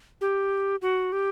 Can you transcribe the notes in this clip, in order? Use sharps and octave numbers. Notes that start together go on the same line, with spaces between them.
G4
F#4
G4